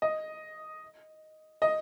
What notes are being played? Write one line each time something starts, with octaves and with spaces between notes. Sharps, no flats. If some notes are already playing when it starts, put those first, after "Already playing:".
D#5
D#5